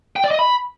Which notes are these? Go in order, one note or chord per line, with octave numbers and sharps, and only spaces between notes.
G5
D5
D#5
B5